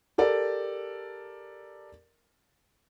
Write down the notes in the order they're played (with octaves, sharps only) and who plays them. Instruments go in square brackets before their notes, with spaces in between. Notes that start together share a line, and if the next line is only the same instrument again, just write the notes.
[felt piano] G4 A4 A#4 D5